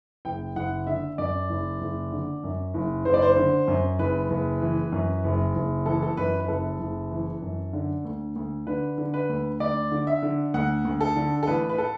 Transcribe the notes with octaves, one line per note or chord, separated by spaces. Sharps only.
F#1 G5
F#1 F#5
D3 E5
F#2 D5
F#1
F#1
D3
F#2
F#1
F#1 C5
D5
C5
D3
F#2
F#1 B4
F#1
E3
F#2
F#1
F#1
E3 A4
A4
F#2 B4
B4
F#1 A4
F#1
E3
F#2
D3
D2
D2
D3 B4
D3
B4
D2
D2 D5
D3
E5
D3
D2 F#5
D2
A4
D3
A4
A1 B4
B4
A4